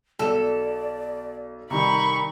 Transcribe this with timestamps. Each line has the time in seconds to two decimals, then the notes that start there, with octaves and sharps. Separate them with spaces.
0.19 B1 A4 D5 E7
1.70 C2 D#3 A#5 B5 C#6